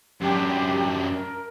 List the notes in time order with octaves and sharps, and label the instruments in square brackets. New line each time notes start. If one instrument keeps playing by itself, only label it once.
[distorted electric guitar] F#2 D4 [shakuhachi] G4
[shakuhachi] A#4